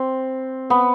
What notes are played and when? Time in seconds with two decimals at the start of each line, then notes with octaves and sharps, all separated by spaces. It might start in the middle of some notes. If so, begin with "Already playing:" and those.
Already playing: C4
0.70 B3